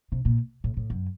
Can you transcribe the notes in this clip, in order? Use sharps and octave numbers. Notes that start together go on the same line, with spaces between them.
C3
A#2
A2
A2
F#2